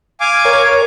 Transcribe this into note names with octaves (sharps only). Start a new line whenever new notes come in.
F5 G#5 D6
A#4 C#5